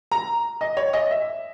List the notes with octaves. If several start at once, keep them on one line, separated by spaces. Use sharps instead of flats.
A#5
D#5
C#5
D#5
E5